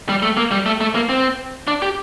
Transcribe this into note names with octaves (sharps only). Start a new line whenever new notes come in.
G3
A3
A#3
G3
A3
A3
A#3
C4
D4
G4